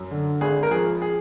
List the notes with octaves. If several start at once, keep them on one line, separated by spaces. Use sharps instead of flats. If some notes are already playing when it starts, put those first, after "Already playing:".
Already playing: F#2
D3
G#1 G#4
A#4
F3 G#4
G#4